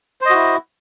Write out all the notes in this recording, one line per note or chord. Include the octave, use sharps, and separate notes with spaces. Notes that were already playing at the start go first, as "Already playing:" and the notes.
E4 F#4 C5 D#5